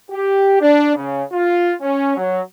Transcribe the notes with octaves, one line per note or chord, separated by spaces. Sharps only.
G4
D4
C#3
F4
C#4
F#3